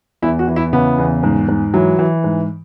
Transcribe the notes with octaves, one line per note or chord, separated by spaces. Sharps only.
E2 E4
F#4
E3
E4
C#3 B3
E2
G#2
G#2
E3 F#3
E3
G#2